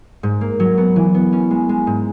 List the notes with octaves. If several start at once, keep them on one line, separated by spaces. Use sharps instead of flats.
G#2
A#3
F#3
B3
E3
B3
C#4
G#3
G#3
G#2